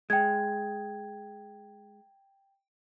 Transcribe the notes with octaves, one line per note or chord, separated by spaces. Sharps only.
G#3 G5 G#6